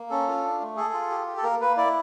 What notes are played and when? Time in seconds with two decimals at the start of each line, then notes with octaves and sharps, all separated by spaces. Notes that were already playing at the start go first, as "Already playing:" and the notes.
Already playing: A#3
0.10 C#4 A4
0.28 F4
0.44 D4
0.60 A3
0.77 G#4 A4
0.94 F4
1.10 G4
1.27 G4
1.37 A4
1.43 A#3 A#4
1.60 A#3 B4
1.77 E4 D5